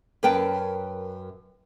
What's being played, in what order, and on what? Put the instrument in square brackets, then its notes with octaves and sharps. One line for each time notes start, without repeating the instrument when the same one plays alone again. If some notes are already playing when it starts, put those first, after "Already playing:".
[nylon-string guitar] F#2 A#4 B4 G5 A5